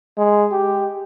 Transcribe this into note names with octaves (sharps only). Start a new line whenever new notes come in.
G#3
G4